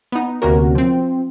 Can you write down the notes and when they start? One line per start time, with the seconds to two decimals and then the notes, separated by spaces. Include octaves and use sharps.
0.12 B3 D#4
0.42 D2 C3 A#3 C#4 F#4 A#4
0.75 F3 C4